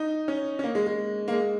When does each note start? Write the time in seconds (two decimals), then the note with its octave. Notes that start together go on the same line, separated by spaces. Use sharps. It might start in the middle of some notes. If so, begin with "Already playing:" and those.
Already playing: D#4
0.28 C#4
0.59 C#4
0.64 A#3
0.75 G#3
0.87 G#3
1.28 A#3
1.33 G#3